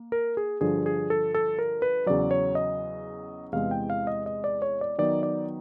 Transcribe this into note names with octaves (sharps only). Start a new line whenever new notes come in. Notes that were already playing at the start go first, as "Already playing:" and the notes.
Already playing: A#3
A#4
G#4
G2 D3 F3 G#4
G#4
A4
A4
A#4
B4
E2 C#3 F#3 D5
C#5
D#5
E2 C3 E3 G#3 F5
G5
F5
D#5
D#5
D5
C#5
D5
D#3 F#3 B3 D#4 D5
D5